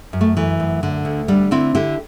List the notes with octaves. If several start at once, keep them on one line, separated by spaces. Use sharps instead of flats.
F#2
A3
E3 A3
F#2
D3
D2
D3 G3
D3 C4 E4
D3 E4 G4